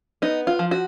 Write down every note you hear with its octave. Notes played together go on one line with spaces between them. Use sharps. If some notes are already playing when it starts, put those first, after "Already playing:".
B3 D#4
F4
F3
F#4